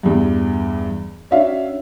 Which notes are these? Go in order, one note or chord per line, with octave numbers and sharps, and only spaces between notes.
E2 G2
C#4 D4 F#4 E5 F5